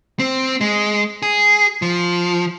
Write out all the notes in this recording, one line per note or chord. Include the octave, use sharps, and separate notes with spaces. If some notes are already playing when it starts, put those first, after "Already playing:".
C4
G#3
G#4
F3